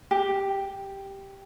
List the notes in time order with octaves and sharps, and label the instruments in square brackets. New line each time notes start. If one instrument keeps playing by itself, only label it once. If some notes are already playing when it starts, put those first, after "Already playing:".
[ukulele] G4